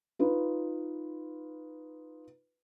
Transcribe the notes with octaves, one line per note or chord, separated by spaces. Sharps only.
D#4 F4 B4